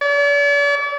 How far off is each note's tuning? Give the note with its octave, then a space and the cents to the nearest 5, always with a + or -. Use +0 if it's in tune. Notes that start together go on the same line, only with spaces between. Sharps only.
D5 -45